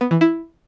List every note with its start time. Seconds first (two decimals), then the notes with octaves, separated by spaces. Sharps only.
0.01 B3
0.11 E3
0.21 E4